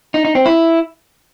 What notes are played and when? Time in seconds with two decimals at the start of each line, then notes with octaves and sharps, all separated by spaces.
0.14 D#4
0.25 D#4
0.35 C4
0.46 E4